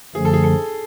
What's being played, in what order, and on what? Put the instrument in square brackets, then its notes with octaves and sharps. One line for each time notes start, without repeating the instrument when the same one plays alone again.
[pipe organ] F#2 D3 F3 A3 [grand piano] G#4
[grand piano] A4
G#4
A4